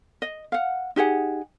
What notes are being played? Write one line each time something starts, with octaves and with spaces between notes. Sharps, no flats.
D#5
F5 F#5
D#4 G4 G#4 F#5